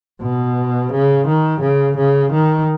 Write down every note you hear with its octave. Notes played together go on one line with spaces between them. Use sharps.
B2
C#3
D#3
C#3
C#3
D#3